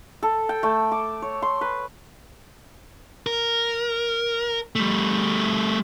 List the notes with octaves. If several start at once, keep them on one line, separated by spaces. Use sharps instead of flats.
A4
G5
A3
D6
C#5
C6
B4
A#4
G3 A3